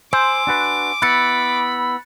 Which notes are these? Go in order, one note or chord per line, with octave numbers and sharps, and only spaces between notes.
C5 G#5 C6 D6 E6
D4 F#4 B4
B3 E4 B5 F#6 A6 C#7